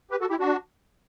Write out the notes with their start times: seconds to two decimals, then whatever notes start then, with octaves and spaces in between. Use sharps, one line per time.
0.11 G4 B4
0.21 F#4 A4
0.30 E4 G4
0.39 D4 F#4